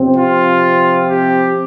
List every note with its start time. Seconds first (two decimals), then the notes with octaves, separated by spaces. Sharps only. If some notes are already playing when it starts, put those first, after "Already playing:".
Already playing: C3 F3 C4
0.16 F4
1.09 G4